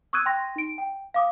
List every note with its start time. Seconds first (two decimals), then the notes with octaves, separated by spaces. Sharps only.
0.13 C#6 D#6 E6 F#6 G#6 D#7
0.26 G5 C6 A#6
0.56 D#4 D7
0.78 G5
1.14 F5 D6 D#6